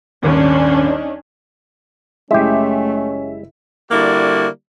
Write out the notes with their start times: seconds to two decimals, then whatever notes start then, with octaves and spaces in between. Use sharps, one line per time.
0.23 D#1 G#1 D#2 C#4 D4
0.86 D#4
2.31 F#1 G#3 A3 C#4 E4 G4 E5
3.91 D3 G3 A#3 E4 F#4 D5